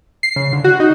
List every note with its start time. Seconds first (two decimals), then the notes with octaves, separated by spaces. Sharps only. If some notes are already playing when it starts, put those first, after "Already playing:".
0.23 C7
0.36 C#3
0.53 D3
0.64 F#4
0.80 D#4